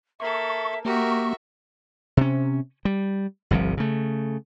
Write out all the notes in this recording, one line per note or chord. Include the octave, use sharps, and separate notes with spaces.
A#3 A4 E5 C#6
A#3 F#4 G4 A#4 E5 C#6
C3 C#4
G3
G1 C2 C3 F3
C#3 A3